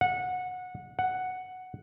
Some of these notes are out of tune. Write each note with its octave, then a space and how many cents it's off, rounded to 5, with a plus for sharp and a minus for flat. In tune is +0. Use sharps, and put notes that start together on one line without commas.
F#5 -20
F#5 +0